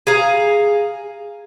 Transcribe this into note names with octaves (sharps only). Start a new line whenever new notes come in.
G#4 F5 A#5